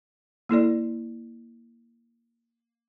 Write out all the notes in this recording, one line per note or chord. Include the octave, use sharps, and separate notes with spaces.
A#3 E4 A4 D5